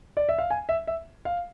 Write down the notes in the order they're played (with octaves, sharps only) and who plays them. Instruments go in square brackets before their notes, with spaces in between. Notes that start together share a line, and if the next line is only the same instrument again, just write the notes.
[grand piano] D5
E5
F5
G#5
E5
E5
F5